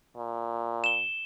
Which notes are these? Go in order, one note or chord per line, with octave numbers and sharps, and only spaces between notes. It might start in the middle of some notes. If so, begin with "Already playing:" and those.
A#2
E7 G7